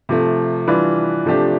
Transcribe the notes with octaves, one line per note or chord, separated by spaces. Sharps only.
C3 F3 A3
E3 G3 D4 F4 B4
C3 F3 A3 D4 G4